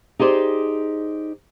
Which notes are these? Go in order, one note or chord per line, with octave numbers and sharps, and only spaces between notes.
D#4 G4 G#4 C5 D5